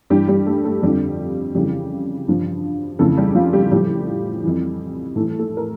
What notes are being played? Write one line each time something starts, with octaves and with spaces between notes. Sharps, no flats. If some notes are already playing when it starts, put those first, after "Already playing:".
G2 E3 G3 G4
G3 G4
A3 A4
A3 A4
F2 D3 F3 G3 G4
F2 C#3 E3 G3 G4
G2 F3
F2 C#3 E3 A3 A4
G3 G4
F3 F4
G3 G4
A2 F3 G3 G4
F2 E3
A2 E3 A3 A4
A3 A4
A#4